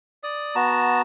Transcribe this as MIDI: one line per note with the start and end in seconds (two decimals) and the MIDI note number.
0.23 0.55 74
0.23 0.55 87
0.55 1.02 59
0.55 1.02 66
0.55 1.02 81
0.55 1.02 82